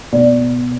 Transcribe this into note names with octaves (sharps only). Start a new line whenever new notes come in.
B2 D5